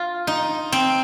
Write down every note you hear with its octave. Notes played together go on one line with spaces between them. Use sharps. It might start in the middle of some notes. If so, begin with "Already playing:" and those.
Already playing: F4
D#4
C4